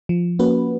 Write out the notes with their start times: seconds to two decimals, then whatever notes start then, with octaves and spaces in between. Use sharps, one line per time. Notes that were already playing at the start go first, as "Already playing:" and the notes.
0.09 F3
0.39 A#3 C#4 F#4 B4